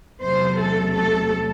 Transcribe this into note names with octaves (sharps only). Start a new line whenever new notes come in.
E2 C3 F#3 A3 C5
A4
A4